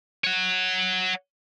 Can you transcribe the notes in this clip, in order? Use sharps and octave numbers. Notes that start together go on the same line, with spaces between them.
C#5 F#5